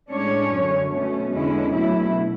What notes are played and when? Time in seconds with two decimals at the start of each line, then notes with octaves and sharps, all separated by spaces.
0.11 A2 G#3 C#4 D4 C#5
0.52 F#2 D3 F#3
0.93 B2 A3 C#4
1.35 E2 D3 G#3 C#4 E4
1.75 B2 F#3 A3 E4